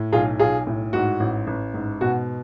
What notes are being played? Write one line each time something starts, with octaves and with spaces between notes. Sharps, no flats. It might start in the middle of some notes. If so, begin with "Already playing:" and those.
Already playing: A2
B1 F4 G#4
B1 F4 G#4
A2
G#2 F#4
A1
A1
G#2
B2 F#4